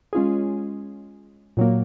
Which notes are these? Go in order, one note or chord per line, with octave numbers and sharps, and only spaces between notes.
G#3 C#4 F4 G#4
A#2 F#3 A#3